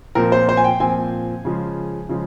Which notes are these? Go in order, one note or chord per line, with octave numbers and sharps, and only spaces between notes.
A#2 F3 C4 A#4
C5
C5
G#5
G5
A#2 F3 C4 G#5
C#3 F3 G#3
C#3 F3 G#3